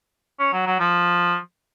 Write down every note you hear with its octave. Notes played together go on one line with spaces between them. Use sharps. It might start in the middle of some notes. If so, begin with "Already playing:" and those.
C#4
F#3
F#3
F3